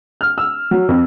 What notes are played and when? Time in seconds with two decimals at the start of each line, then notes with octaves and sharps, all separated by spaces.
0.21 F6
0.38 E6
0.71 F#3
0.89 F2